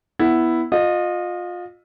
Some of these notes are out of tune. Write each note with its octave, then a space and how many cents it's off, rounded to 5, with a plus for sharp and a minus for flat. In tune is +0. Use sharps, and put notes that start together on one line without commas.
B3 +0 E4 +0
F4 +25 D#5 -20